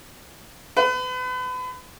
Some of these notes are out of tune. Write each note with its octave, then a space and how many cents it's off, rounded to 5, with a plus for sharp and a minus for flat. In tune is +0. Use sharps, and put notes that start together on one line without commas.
B4 +35